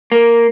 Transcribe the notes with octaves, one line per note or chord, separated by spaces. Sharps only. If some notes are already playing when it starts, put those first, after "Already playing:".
A#3